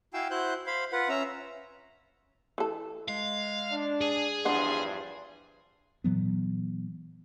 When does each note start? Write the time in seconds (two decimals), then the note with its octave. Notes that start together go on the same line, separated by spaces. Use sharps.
0.14 E4 F#4 F5 G5 G#5 E6
0.31 E4 F#4 C5 F#6 G6
0.67 C5 F5 B5
0.92 F4 B4 F#5
1.09 C#4 E5 A#5
2.58 E3 A4
3.08 G#3 F5
3.71 D4
4.01 G#4
4.45 E2 G2 F3 D4 D5 F#5 C6
6.04 A#2 E3 F#3 B3